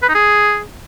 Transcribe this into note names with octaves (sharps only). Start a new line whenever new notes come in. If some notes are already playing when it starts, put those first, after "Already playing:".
B4
D#4
G#4